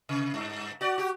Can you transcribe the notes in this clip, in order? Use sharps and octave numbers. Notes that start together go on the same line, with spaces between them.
C3
G2
F#4 D5
F#4 G4